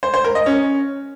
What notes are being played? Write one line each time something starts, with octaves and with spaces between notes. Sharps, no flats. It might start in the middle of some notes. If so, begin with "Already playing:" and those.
C5
C5
A#4
D#5
C#4